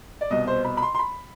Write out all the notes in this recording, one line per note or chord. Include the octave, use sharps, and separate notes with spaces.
D5
C2 B2 D#5
C5
B5
B5
C6
C6
B5